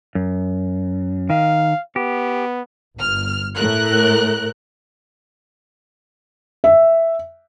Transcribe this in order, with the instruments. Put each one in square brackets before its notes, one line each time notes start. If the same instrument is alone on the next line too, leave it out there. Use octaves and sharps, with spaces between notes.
[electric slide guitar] F#2
[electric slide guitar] D#3 [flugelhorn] F5
[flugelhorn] B3 [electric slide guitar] G4
[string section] G1 F6
A2 A3 A#4 F#6
[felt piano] E5